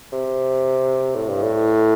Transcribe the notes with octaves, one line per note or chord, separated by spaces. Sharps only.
C3
A2
G2
A2